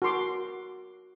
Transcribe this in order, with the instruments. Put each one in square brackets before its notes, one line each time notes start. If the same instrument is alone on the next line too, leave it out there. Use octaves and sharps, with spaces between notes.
[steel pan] F#4 A#4 C6 D6